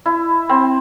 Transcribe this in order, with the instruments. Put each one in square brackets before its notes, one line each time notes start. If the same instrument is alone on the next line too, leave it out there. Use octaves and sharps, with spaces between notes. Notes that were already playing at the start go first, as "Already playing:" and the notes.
[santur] E4
C4